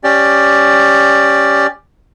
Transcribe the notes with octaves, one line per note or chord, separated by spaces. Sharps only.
C#4 G4 D5